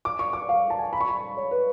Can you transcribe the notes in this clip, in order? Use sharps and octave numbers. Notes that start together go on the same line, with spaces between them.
D6
C#6
D6
F5
A5
G#5
B5
C#6
B5
C#5
B4